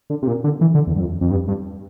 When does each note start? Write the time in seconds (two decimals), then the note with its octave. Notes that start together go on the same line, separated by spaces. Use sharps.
0.10 D3
0.22 C3
0.27 A#2
0.44 D3
0.61 E3
0.75 D3
0.87 E2
0.96 G2
1.00 F2
1.21 F2
1.31 G2
1.48 G2